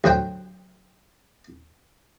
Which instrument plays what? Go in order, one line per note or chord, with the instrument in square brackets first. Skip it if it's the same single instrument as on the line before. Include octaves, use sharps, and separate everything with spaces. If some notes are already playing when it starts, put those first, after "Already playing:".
[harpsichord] D2 F#3 C5 G5